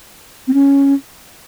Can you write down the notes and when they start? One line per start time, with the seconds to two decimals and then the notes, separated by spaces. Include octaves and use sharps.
0.48 C4
0.54 C#4